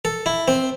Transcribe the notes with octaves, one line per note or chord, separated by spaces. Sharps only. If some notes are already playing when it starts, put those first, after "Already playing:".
A4
E4
C4